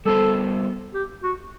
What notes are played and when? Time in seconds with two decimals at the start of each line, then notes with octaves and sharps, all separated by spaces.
0.05 G3 B3 F#4 A4 C5
0.94 G4
1.23 F#4